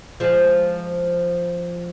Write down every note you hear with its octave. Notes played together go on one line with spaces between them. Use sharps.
F3 G#3